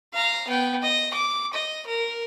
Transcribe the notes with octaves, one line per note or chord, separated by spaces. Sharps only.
F5 A#5
B3 G5
D#5
D6
D#5
A#4